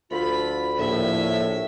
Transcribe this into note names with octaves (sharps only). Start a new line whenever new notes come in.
D2 F3 A3 F4 B5
A#1 A2 E5